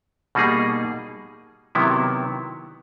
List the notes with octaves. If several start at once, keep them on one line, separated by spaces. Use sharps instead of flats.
B2 G3 A#3 D#4 G#4
C3 D#3 F#3 B3 E4